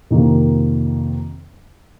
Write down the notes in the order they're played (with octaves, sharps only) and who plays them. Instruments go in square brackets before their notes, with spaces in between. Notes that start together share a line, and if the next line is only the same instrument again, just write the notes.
[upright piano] F2 C3 D#3 A#3